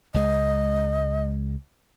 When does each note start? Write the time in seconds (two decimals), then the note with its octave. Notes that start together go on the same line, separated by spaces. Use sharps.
0.14 C#2 G#3 D#5